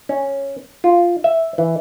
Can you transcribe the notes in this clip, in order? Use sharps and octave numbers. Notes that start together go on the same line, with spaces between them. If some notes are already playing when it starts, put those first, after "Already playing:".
C#4
F4
E5
E3